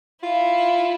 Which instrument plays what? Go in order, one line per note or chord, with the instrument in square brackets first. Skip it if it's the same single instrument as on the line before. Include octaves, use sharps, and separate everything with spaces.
[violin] E4 [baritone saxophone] F4